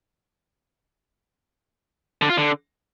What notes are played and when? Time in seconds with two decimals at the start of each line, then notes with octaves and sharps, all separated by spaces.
2.22 D3
2.30 F4
2.37 D3